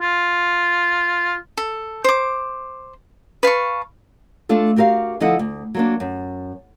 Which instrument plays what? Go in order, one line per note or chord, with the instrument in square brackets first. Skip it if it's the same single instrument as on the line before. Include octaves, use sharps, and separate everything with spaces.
[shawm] F4
[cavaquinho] A4
C5 D6
B4 F5 A5 C#6
[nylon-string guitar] A3 D4 F4 A4
F#4 G4 A#4 D#5 F5
D2 F3 E4 A4 D#5 F#5
D2
F#3 A#3 D4
F#2